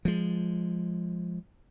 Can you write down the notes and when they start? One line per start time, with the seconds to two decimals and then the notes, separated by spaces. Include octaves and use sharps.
0.05 F3 G#3